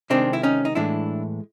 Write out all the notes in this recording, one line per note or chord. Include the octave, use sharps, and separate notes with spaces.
C3 D#3 G#3 C4 D4
E4
C#4 D#4
D#4
A2 E3 G#3 D4 E4